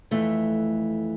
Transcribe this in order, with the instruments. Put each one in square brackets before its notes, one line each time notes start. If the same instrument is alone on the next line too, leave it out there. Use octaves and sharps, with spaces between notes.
[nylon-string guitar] F2 E3 A3